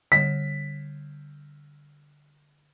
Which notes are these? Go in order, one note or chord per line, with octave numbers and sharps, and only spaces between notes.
D3 G3 B6